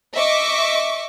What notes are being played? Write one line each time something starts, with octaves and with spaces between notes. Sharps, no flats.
D#5 E5 C#6 D6